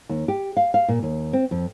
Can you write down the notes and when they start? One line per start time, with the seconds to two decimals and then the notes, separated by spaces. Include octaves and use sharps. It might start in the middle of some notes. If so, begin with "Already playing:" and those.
0.09 D#2
0.28 G4
0.57 F5
0.74 F5
0.88 A#2
1.03 D#2
1.33 C4
1.51 F2